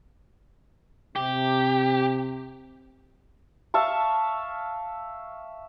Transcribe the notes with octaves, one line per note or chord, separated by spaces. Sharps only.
C3 G4
E5 F5 A5 C#6